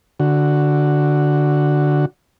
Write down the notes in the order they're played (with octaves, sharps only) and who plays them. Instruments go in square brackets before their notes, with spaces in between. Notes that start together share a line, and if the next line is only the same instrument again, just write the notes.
[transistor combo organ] D3 F#4